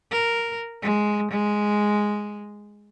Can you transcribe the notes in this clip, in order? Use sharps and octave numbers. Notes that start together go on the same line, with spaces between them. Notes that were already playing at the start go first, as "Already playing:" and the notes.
A#4
G#3
G#3